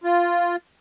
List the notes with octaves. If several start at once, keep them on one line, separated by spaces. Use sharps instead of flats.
F4